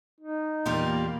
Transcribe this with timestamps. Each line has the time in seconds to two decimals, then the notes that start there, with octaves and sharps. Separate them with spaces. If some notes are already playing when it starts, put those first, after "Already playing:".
0.21 D#4
0.66 E2 A#2 G3 A#3 F4 G4